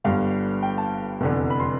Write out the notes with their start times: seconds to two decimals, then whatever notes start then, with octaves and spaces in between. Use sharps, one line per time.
0.04 G1 G2 D3 F5
0.63 G5
0.78 A5
1.21 F1 E2 D3
1.50 B5
1.60 C6